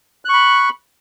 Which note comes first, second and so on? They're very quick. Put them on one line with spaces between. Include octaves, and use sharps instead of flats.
F#6 C#6 B5